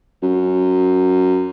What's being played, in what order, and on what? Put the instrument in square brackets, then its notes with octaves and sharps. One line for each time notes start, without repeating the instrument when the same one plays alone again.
[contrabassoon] F#2